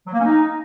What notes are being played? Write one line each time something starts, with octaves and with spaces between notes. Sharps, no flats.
F#3
A#3
C#4
D#4